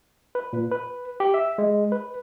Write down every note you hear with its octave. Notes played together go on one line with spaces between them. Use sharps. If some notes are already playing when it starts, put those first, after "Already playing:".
B4
A#2
B4
G4
E5
G#3
B4